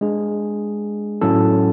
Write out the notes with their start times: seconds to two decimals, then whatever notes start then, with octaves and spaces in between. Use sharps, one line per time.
0.01 G#3 D4 G#4
1.21 A2 F#3 C#4 E4 A4